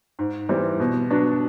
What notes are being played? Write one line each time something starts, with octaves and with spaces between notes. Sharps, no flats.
G#2
E3 G3 C4
B2
F#3 B3 D4